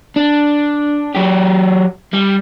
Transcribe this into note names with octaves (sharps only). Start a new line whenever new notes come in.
D4
F#3 G4
G3